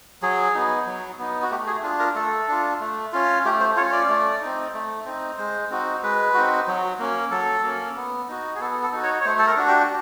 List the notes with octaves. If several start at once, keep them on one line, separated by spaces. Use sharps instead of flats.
F#3 G#4
B3 D#4
F#3
B3 D#4
F#4
A3 G4
G#4
D4 F4 G#4
A#4
A3 A4
D4 F4
A3
C#4 F4
A3 G4
C5
C#4 F4 C#5
D5
A3
C4 D#4
A3
C4 D#4
G#3 C5
C4 D#4 F#4
G#3 B4
C4 D#4 F#4
F#3
A#3 C#4
F#3 A4
A#3 C#4
B3
D#4 F#4
G#4
B3 A4
A4
D#4 F#4
C#5
C#5
A3 C5
A4
A#4
D4 F#4
G4